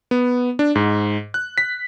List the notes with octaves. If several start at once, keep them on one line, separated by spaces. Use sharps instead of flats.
B3
D4
G#2
F#6
B6